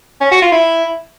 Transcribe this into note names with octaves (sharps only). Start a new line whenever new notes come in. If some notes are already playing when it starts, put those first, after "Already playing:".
C#4
F#4
F4
E4